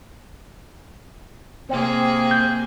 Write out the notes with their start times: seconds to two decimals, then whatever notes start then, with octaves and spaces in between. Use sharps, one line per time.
1.69 C3 A#3 C4 G#4
2.31 G6